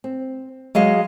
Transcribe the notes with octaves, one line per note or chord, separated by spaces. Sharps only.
C4
F#3 G#3 D#5 F5